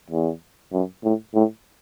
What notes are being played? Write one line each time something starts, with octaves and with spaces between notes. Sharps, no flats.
E2
F#2
A2
A2